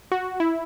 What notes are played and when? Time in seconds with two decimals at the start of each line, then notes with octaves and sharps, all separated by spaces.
0.12 F#4
0.40 E4